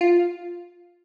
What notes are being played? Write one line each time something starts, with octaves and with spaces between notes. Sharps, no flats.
F4